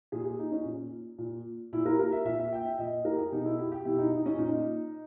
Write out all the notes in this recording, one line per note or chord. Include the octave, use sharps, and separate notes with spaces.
A#2 G#4
G#4
D#4
C#4
A#2
A#2
A#2 E4
A#4
A#4
E5
A#2 E5
E5
G5
E5
A#2 D#5
A#4
G4
G#4
B2 D#4
E4
G4
G4
B2 E4
D#4
D#4
C#4
A#2 D#4